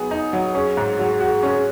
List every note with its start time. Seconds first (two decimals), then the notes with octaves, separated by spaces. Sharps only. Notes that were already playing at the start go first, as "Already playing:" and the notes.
Already playing: F#3 B3 D#4 G#4
0.11 D#4
0.33 F#3
0.55 C#4 G#4
0.77 G#2
0.99 F#3
1.21 F#4
1.43 C#4